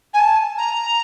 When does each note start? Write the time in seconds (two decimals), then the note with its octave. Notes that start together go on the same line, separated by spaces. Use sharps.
0.14 G#5
0.19 A5
0.58 A#5